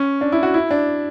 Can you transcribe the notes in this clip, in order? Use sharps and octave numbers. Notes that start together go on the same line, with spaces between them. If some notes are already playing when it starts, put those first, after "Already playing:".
Already playing: C#4
D4
E4
F#4
E4
D4